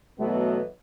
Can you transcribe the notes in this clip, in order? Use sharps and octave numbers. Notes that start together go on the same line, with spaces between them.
B2 E3 F#3 A3 B3